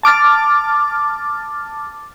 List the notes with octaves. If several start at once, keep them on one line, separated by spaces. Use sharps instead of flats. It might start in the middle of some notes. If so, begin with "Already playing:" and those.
A5 D6 F6 A6